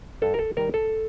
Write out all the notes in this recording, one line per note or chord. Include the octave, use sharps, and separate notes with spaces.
G2 A4
A#4
A4
D#3 G3 A#4
A4